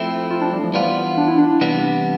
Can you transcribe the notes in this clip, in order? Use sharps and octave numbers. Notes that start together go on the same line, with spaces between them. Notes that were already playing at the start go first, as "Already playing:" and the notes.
Already playing: F3 A3 C4 E4
F4
D4
G3
F3
E3 G3 B3 F4
D4
E4
D4
C3 E3 G3 B3 D4